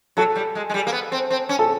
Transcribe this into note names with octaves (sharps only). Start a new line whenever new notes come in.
F#3 A4
G3
G#3
G#3
G3
A#3
B3
C4
C4
C#4
A4